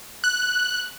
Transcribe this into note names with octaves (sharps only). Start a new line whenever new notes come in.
F#6